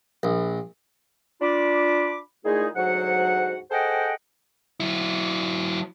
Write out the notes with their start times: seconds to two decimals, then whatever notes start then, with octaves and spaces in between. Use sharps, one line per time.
0.23 A#1
1.42 D4 F4 B5 D6
2.45 A#2 G#3 A3 D#4 E4 G#4
2.76 D2 G#2 F#3 F#4 C5 F#5
3.71 G#4 A4 C5 D#5 F#5 G5
4.80 F#3 E4